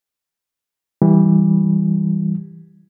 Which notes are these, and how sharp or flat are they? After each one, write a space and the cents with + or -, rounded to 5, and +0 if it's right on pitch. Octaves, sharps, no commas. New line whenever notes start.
E3 -10 G3 +0